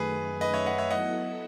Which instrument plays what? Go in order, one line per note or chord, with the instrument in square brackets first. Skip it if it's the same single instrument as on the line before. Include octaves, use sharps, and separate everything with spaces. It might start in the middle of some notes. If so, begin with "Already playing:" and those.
Already playing: [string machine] F#2 D#3 A3 [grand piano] G#4 B4
[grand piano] B4 D#5
C#5 E5
D#5 F#5
C#5 E5
[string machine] F#3 B3 E4 A4 [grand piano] D#5 F#5